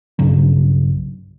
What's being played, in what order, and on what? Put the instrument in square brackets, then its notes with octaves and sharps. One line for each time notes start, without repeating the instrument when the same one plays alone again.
[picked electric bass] B1 G2 C#3 F#3